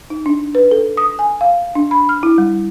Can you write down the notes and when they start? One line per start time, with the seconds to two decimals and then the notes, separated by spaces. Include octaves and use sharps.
0.10 D#4
0.26 D4
0.55 B4
0.71 A4
0.97 D#6
1.19 G#5
1.41 F5
1.75 D4
1.91 B5
2.09 F6
2.23 E4
2.38 G3